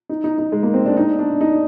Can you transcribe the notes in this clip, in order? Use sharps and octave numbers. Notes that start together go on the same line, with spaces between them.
D#4
D#4
D#4
G#3
A#3
C4
D4
D#4
D4
D#4